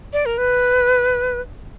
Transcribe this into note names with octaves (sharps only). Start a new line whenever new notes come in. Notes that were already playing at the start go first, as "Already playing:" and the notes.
D5
A#4
B4